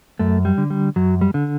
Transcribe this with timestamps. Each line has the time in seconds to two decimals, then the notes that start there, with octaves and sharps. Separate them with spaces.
0.19 F#2 A3
0.45 G3
0.58 D3
0.70 G3
0.96 F#2 F#3
1.21 G3
1.34 D3